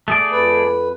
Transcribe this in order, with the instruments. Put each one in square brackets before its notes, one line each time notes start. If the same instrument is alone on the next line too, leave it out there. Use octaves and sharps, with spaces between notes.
[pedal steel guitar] A3 G#4 D5
[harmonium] F2 B4